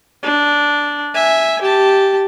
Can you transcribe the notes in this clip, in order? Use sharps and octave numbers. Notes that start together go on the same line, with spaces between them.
D4
E5 G#5
G4 A5